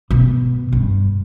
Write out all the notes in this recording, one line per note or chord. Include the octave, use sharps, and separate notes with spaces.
B2
G2